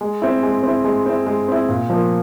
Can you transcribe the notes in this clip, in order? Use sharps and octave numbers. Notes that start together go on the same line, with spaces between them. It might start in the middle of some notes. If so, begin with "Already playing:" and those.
G#3
C4 E4
G#3
C4 E4
G#3
C4 E4
G#3
C4 E4
A#2
F3 A#3